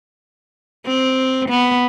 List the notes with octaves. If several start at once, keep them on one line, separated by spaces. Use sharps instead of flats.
C4
B3